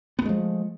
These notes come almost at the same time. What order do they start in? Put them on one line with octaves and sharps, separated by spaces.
B3 A3 G#3 F3